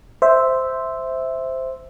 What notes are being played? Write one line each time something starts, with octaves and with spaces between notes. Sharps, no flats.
C5 E5